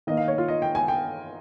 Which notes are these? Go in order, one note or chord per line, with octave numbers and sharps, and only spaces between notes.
D#3 A#3 D#5
F5
C#5
F4
D#5
G5
G#5
G5